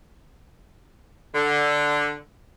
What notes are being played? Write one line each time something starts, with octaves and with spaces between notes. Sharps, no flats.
D3